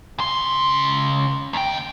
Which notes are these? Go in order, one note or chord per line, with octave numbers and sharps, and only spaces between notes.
C#3 C6
D#2 G5